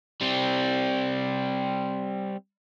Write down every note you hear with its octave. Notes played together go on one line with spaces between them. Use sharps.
G3 C4